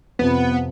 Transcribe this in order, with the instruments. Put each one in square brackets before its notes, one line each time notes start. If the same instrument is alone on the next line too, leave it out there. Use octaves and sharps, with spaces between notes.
[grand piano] F2 C3 F3 [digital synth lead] B3